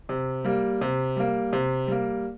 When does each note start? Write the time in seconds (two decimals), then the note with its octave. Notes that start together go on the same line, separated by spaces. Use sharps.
0.09 C3
0.45 G3 A#3
0.81 C3
1.17 G3 A#3
1.53 C3
1.87 G3 A#3